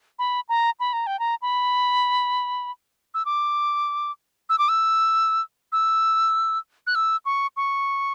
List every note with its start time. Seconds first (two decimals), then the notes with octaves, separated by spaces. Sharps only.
0.19 B5
0.49 A#5
0.80 B5
0.93 A#5
1.07 G5
1.19 A#5
1.42 B5
3.14 E6
3.25 D6
4.49 E6
4.58 D6
4.69 E6
5.72 E6
6.87 F#6
6.95 E6
7.25 C#6
7.57 C#6